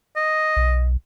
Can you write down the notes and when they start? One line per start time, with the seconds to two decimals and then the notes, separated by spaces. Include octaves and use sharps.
0.16 D#5
0.57 B1